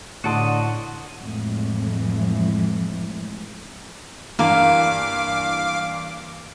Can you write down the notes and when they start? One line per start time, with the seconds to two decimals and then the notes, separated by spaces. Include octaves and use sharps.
0.24 A2 D3 F#4 D5 D#5 F#5 A5 C6
1.19 F2 A2 E3 G#3
4.39 G2 E3 A#3 F5 D6